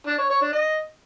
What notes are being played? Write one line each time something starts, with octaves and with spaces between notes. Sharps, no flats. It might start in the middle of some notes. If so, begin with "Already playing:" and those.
D4
C#5
C#5
D4
D#5